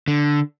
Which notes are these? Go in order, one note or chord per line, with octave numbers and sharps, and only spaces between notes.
D3